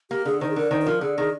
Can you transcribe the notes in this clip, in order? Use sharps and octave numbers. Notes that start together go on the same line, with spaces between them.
A#3 G4
D3 G#4
D#3 C5
G#4
D3 A#4
D#3 C5
C5
F3 A#4
D3 G#4
D#3 G#4